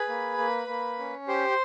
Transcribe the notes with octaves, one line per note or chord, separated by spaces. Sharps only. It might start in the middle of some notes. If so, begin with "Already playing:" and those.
Already playing: G#4 B4 B5
A#3
A#3
A#3
C#4
G4 C5 C6